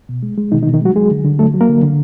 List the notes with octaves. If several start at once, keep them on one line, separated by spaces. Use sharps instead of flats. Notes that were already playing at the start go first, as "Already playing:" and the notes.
B2
G#3
G#3
B2 D#3 D#4
D#3 D#4
B2
D#3 D#4
F#3 G#3 F#4
F#3 G#3 G#4
D3
D3
F#3 A3 A4
F#3
A#3 A#4
D3
D3